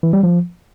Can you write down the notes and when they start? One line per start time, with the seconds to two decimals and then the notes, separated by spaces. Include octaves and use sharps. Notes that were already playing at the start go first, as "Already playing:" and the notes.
0.03 E3
0.13 G3
0.23 F3